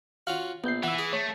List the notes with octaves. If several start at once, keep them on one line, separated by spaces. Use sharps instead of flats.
C#4 F4 F#4 F5
A#1 B3 G6 C7
E3 E4 F#5 E6
G#4
A3 C#5